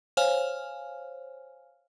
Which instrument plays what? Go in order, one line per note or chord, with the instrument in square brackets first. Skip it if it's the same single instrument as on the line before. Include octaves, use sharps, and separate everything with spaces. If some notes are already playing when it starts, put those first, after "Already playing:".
[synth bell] C5 C#5 F5 G#5 F6